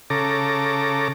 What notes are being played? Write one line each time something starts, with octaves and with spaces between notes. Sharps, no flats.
C#3 A4 A#5 D6